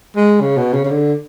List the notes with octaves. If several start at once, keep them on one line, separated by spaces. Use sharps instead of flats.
G#3
C#3
B2
C#3
C#3
D3